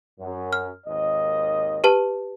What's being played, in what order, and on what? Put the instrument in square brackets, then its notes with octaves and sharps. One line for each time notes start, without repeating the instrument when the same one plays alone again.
[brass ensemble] F#2
[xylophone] F6
[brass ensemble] G#1 D#2 D#5
[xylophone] G4 B4 A5